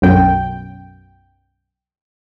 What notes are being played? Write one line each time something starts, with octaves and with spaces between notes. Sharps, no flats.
B1 F#2 G5